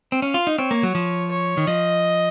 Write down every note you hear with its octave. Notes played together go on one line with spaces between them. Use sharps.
C4
C#4 F5
F4
D#4
C4 C#5
A#3
F#3
F3
C#5
D#3
F3 D#5